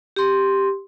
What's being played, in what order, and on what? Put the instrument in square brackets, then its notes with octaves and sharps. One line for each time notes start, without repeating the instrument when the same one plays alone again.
[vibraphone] G4 C6